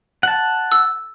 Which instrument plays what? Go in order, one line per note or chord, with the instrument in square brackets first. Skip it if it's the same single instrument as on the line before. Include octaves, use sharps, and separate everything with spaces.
[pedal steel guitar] F#5 A5
[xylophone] E6